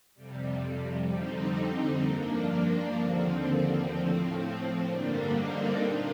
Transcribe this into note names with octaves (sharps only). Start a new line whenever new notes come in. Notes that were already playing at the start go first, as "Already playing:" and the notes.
F2 C3 G3
F2 D3 G3 C4 D#4
C4 D#4
G2 F3 A#3 D4
A#3
D#2 D3 F3 C4
C4
A2 F3 C4
C4
G2 D3 G3 A#3 D4
C4 D#4
A#2 D4 F4